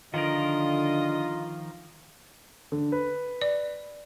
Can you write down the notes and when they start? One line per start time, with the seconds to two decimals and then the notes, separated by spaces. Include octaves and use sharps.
0.14 D3 D#3 F3 F4 A#4 D#5
2.72 D3
2.92 B4
3.41 D5